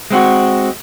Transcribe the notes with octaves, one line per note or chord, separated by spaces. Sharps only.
G#3 C4 F#4